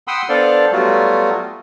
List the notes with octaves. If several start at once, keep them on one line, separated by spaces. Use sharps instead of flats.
F#5 G5 B5 C6 D#6 E6
B3 D4 A4 C5 D5 F5
F#3 G3 A3 B3 F4 F#4